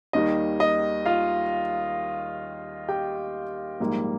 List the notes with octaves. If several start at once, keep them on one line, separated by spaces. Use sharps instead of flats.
D#2 D#3 G3 D#5
D#5
F4 F5
G4 G5
A#1 G#2 G3 A#3